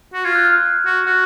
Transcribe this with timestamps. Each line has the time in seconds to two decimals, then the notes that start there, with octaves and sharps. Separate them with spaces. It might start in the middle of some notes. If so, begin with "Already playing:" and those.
0.13 F#4
0.25 F4 G#6
0.35 F#6
0.45 F6
0.55 F#6
0.86 F#4
1.06 F#4 F#6